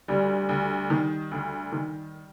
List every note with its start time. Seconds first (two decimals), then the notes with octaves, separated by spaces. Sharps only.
0.08 D2 G3
0.49 D2
0.90 D#3
1.31 D2
1.72 D#3